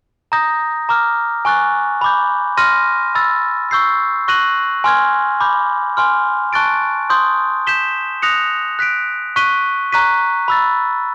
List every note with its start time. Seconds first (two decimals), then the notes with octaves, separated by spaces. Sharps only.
0.32 A#5 D#6 G6 A#6
0.89 A#5 D6 F6
1.45 G#5 C#6 F#6 A6
2.01 B5 D6 G6
2.57 C6 F6 A#6 D#7
3.15 B5 E6 A6
3.71 C#6 E6 G6 C7
4.28 C#6 F#6 A#6 D#7 F#7
4.84 G#5 C6 F6 G#6
5.40 B5 D6 G6
5.97 G#5 C6 F6
6.53 A5 C#6 F#6 A6 D7
7.10 C6 D#6 G6
7.67 G6 B6 E7 G7
8.22 D#6 F#6 A#6 C#7 F7
8.79 F#6 B6 D7
9.36 C#6 F#6 B6 D#7 G7
9.92 A#5 C#6 F#6 B6 D#7
10.48 B5 E6 A6